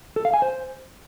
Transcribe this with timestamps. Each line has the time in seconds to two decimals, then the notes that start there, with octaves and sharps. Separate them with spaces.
0.16 A4
0.25 F5
0.34 G#5
0.42 C5